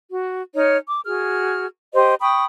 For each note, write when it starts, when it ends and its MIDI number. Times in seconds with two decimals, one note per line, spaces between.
0.12 0.43 66
0.55 0.77 63
0.55 0.77 73
0.55 0.77 89
0.88 1.00 86
1.06 1.66 66
1.06 1.66 68
1.06 1.66 89
1.94 2.15 67
1.94 2.15 72
1.94 2.15 75
2.21 2.46 79
2.21 2.46 83
2.21 2.46 85
2.21 2.46 87